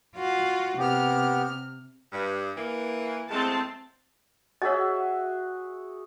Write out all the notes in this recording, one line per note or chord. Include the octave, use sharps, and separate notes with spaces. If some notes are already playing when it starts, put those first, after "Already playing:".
F4 F#4
C3 B3 G4 F6
G2
E3 A#3
E2 G#3 A3 C4 A5
F#4 G#4 C#5 D#5 E5